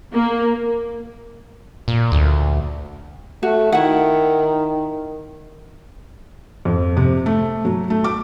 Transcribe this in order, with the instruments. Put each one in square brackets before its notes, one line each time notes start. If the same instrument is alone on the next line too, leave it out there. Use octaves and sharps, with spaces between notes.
[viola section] A#3
[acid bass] A#2
D2
[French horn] A3 [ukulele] F#4
[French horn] D#3 [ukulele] E4 F#5
[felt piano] F2
C3
A3
F#3
A3
D6